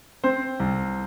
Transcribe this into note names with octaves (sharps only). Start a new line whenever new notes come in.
C4 C5
C2